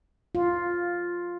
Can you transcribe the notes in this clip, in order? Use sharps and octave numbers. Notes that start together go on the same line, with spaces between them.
F4